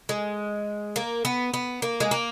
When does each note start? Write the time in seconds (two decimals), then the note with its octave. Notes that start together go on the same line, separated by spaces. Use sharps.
0.09 G#3
0.96 A#3
1.25 B3
1.54 B3
1.82 A#3
2.00 G#3
2.11 A#3